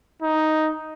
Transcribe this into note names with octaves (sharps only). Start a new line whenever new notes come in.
D#4